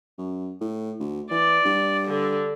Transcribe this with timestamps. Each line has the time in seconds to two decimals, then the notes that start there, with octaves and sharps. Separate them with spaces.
0.18 F#2
0.61 A2
0.99 D2
1.31 E3 D5
1.65 G2
2.08 D3